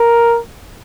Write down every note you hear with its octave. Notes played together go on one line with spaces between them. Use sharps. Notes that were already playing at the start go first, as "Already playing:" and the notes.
Already playing: A#4